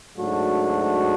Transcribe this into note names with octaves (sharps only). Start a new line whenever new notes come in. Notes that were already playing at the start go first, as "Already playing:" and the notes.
G#2 F#3 A3 D4 F#4